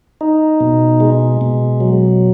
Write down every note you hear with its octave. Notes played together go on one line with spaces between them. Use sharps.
D#4
B2
G#3
B2
F#3